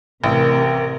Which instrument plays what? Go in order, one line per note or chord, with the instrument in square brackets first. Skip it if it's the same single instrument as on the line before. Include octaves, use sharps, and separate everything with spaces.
[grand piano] A1 [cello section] C3 A#4